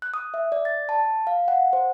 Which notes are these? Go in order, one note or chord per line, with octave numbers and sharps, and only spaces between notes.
F#6
D#6
E5
D5
A6
A5
F5
F#5
C5